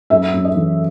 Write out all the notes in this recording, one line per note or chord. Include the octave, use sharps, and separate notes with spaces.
F#2 E5
F#2
D#5
E3